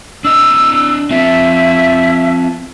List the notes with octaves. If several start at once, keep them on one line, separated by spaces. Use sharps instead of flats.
D4 D#5 E6
C4 F4 E5